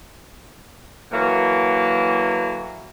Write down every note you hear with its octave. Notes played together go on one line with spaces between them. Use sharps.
D3 E3 F#3 A#3